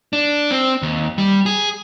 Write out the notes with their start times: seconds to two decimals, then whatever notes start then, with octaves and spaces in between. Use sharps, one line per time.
0.13 D4
0.51 C4
0.82 D#2
1.18 G3
1.46 G#4